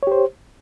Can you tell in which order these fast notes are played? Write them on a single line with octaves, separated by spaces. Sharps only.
C#5 G4 C5